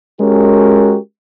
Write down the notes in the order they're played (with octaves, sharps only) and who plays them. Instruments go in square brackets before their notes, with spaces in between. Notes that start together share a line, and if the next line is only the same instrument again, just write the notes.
[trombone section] G#3 C#4 F#4 G4 A#4